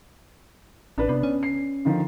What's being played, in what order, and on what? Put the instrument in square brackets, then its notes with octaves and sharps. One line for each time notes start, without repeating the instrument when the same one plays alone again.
[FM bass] A1 [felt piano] D4 B4
[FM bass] C3 [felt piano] B3 D4
[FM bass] C#4
[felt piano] C7
D3 D#3 F3